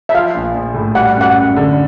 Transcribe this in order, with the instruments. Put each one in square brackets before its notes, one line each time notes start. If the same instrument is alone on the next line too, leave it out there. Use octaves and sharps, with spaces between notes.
[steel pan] E5
[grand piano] F3 [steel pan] F5
[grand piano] A#1
A#1
A2
[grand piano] G3 [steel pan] F#5
[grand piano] F#2
[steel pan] F#5
[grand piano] F#2
D3